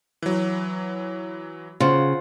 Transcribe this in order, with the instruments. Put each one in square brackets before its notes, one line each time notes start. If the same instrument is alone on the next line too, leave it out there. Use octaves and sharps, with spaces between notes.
[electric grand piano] E3 F#3
[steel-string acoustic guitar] C#3 [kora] F4 C5 F#5